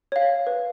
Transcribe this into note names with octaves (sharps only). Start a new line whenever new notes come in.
C#5 F5
B4